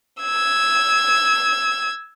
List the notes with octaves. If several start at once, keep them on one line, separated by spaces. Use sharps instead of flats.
E6 G#6